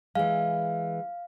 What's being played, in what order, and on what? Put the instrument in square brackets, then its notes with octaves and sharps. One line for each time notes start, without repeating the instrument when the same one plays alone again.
[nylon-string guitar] E3 G#3 [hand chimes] F5